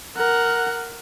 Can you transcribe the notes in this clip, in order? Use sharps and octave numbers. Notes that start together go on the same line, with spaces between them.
A#4 F#5